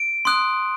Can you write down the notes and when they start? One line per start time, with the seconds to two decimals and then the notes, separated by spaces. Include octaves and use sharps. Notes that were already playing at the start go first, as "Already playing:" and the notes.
Already playing: D7
0.25 C6 D#6 F#6